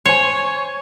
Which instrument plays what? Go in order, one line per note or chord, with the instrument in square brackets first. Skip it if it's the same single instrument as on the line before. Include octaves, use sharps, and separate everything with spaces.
[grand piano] C5 G#5 [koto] C#5